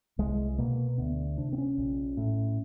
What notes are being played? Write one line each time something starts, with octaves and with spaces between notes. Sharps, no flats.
C2 G#3
B2 A#3
D2 B3
C3 D4
C4
C#4
A#1
A2